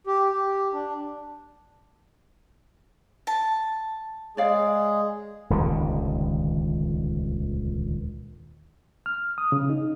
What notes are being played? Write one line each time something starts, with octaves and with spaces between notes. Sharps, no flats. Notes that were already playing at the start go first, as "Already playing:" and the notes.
G4
G4
D4
A5
G#3 G#4 C#5 D5 F5
D#1 C#2 D3 D#3
F6
D#6
C#3
D#4